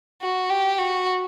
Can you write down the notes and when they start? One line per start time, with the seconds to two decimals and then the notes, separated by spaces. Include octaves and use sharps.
0.22 F#4
0.50 G4
0.78 F#4